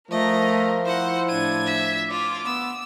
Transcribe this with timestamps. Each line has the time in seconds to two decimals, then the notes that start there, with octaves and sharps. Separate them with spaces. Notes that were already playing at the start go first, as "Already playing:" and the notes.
0.11 F3 A3 A#4 D#5 A#5
0.85 E4 C5 F#5
1.29 A2 D4 G#6 D#7
1.66 E5
2.10 F4 D6
2.45 B3 E6